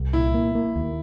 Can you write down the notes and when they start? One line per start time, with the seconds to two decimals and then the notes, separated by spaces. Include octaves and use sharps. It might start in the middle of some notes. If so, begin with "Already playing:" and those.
Already playing: C2
0.13 A#2 E4
0.34 A#3
0.55 A#3
0.76 D#2